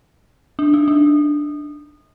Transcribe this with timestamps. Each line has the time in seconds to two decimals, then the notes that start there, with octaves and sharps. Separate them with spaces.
0.59 D4
0.74 D#4
0.88 D4